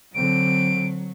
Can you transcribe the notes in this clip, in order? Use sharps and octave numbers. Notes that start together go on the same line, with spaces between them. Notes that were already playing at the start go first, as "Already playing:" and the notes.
D3 F#3 C4 D7